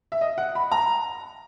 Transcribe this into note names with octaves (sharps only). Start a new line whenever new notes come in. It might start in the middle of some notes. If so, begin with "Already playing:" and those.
E5
D#5
F#5
B5
A#5